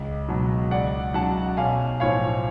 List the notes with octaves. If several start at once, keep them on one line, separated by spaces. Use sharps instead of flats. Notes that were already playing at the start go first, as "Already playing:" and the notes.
Already playing: C#2
B2 F#3
C#2 D5 F#5
C#3 F#3 F#5 A5
B1 F5 G#5
A2 F3 C#5 F5